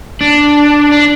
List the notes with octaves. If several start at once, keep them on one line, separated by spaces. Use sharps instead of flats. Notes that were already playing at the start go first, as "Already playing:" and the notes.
D4
D4